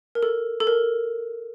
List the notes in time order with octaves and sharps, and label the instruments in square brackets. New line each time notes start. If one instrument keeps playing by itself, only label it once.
[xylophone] A#4
A4
A4
A#4